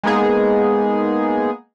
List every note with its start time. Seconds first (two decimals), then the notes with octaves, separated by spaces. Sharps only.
0.03 G#3 A#3 B3 D#4 G#4